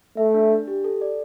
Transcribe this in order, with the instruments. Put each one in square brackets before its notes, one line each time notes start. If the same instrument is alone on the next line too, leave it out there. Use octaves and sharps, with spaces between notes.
[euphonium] A3 [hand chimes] E5
[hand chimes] D4
D4
G4
A4
D5